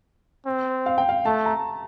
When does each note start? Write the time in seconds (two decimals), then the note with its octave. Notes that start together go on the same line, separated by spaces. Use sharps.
0.46 C4
0.86 F5
0.98 G5
1.09 F5
1.26 A3 A5
1.46 A#5